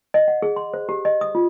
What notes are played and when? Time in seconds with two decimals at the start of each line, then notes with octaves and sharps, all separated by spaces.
0.14 D#5
0.28 F#5
0.42 G#4
0.56 C6
0.74 C5
0.89 G4
1.05 D#5
1.21 D#6
1.35 F4